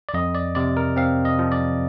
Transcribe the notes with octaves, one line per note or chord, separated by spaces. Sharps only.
D5
F2 D#5
D5
C3 D5
A#4
C4 F5
D#5
F3
D5